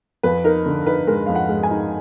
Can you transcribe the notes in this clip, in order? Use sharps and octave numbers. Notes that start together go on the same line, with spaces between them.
F2 B4
D#4 A#4
D3
D#4 B4
G#3 A#4
F2 F5
F#5
G#3
G#5
D#4